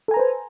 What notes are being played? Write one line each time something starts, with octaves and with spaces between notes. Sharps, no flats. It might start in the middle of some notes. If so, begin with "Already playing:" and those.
A4 B4 C5 G#5 A#5